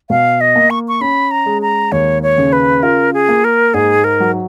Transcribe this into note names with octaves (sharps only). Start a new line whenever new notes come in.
B2 F5
D#5
A#3
C#6
C#6
C#4 B5
A#5
G#3
A#5
D#2 C#5
C#5
C#3
B4
F4 A#4
G#4
A#3
A#4
G#2 G#4
A#4
F#3